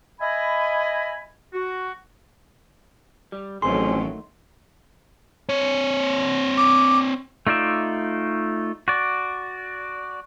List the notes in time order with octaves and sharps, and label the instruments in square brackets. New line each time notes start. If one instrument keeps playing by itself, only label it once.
[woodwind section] D#5 E5 G#5 B5
F#4
[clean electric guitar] G3
[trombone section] A1 [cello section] D#3 F#3 A3 [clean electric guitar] F3 C4 G#4 [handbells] C6
[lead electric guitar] C4 C#5
[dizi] D6
[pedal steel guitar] A3 D#4 F4 D5 E5
F#4 D5